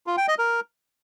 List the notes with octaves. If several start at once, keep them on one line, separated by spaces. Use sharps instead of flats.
F4
G5
D#5
A#4